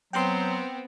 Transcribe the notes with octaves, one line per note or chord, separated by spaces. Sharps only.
F#3 B3 C4 G5 C6